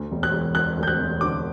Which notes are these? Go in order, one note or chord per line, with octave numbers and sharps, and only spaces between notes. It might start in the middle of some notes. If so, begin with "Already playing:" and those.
Already playing: D2
E1
F#6
E1
E1 F#6
D2
G6
F#6
E1
D3 D6